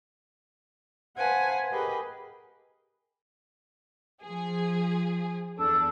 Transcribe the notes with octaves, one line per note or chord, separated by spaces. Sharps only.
B4 C5 F5 F#5 G#5 A5
G4 G#4 A#4 B4 D#5
F3 G#4
E2 D4 A4